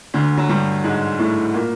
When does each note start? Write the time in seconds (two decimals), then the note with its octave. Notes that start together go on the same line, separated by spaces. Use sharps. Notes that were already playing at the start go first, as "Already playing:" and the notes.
0.14 D2 D3
0.37 F#3
0.49 G2 G3
0.84 G#2 G#3
1.19 A2 A3
1.54 A#2 A#3